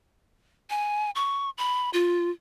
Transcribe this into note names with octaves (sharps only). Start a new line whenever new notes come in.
G#5
C#6
B5
F4